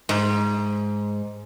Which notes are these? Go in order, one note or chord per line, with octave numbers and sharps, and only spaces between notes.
G#2